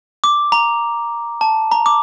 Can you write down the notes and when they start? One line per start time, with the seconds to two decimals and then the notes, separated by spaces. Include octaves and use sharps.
0.24 D6
0.52 A#5
1.41 A5
1.72 A#5
1.86 D6